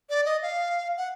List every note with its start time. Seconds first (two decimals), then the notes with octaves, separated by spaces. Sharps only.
0.10 D5
0.25 D#5
0.42 F5
0.97 F#5